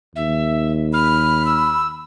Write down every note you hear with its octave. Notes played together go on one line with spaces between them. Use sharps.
D#2 E5
B5 F6
E6